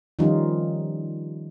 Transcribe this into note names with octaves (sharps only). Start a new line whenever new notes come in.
D#3 F3 G3 C#4 D#4 F4